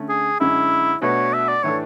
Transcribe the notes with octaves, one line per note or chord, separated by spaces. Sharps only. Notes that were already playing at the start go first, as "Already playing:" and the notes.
Already playing: D3 A3 C#4
G#4
F#2 D3 G#3 C#4 E4
B2 A3 D4 F#4 B4 C#5
E5
D5
A2 E3 A3 D4 A4 C#5